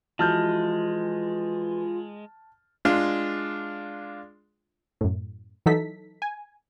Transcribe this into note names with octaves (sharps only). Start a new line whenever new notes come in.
E3 F3 G#3 F4 F#4 A5 F6 G6
G#3 D4 F4
F#2 A2
E3 F#3 D#4 A4 B6
G#5